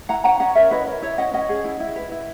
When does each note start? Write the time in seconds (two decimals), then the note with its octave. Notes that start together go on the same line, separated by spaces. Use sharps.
0.09 E4 F#5 A#5
0.24 C#4 F#5 A#5
0.40 C#4 D#5 F#5
0.55 A#4 C#5 E5
0.71 E4 B4 D#5
0.87 A#4 C#5
1.02 E4 C#5 E5
1.18 C#4 D#5 F#5
1.33 C#4 D#5 F#5
1.49 G#4
1.65 E4
1.80 E4
1.96 B4
2.12 E4